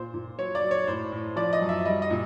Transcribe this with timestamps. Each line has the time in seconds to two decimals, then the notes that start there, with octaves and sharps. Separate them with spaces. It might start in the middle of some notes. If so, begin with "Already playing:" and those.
Already playing: A#2 C5
0.14 A#2
0.38 F#3 C#5
0.55 D5
0.63 F#3
0.71 C#5
0.87 A2 C5
1.12 A2
1.36 F3 D5
1.53 D#5
1.61 F#2
1.69 E5
1.85 G3 D#5
2.02 D#5
2.10 A#2